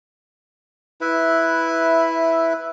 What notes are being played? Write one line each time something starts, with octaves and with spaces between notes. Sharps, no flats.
E4 B4 E5